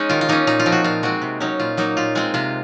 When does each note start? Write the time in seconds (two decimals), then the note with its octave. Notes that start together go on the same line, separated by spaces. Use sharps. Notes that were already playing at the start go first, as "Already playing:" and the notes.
Already playing: G#3 C#4 D#4
0.09 D#3 F4
0.21 F4
0.28 A#3 C#4 D#4
0.47 A#2 D#4
0.59 F4
0.66 F3 C4
0.72 F#4
0.84 A#2 F4
1.03 G#3 C4 F#4
1.22 C3
1.40 F#3 C#4 D#4
1.60 A#2 F4
1.77 F#3 A#3 D#4
1.97 A#2 F4
2.15 G#3 C4 F4
2.34 C3 F4